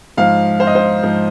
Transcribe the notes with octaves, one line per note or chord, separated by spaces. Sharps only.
G#2 F3 F5
C5
D#5
C5
G#2 F3